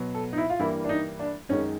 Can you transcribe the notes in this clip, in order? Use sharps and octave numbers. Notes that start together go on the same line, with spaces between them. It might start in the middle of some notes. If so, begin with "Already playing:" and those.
Already playing: B2 F#3 B3
A4
D#4
E4
F4
G2 E3 G3 A#3 E4
D4
D#4
D4
F#2 D#3 G#3 C#4